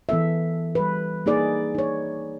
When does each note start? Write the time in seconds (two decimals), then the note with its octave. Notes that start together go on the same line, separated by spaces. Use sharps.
0.09 E3 B3 A4 E5
0.75 G3 B4
1.26 A#3 D#4 G#4 D5
1.75 D#4 C#5